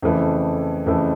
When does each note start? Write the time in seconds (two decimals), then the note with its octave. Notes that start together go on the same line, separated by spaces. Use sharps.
0.02 F2 C#3 E3 A3
0.86 F2 C#3 E3 A3